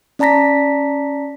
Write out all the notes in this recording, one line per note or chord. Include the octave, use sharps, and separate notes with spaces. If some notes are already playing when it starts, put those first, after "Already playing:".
C#4 D5 A5 A#5 A#6 B6